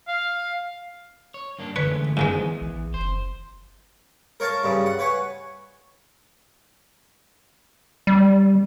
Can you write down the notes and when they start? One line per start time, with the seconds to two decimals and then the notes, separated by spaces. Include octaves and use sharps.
0.08 F5
1.34 C#5
1.59 G2 A#3 D4
1.76 D3 E3 G#3 A3 B4 C#5
2.17 G#2 D#3 E3 G#3 B3
2.61 A#1
2.94 F#1 C5
4.40 A#4 C#5 F5 A5 A#5
4.64 G2 C#3
4.86 F#5
4.99 B4 C#5 F#5 G#5
8.07 G3